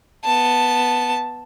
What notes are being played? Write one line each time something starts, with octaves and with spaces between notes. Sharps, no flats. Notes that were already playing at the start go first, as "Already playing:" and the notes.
B3 A5